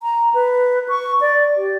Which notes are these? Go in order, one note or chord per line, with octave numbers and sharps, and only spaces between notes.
A#5
B4
C#6
D5
G4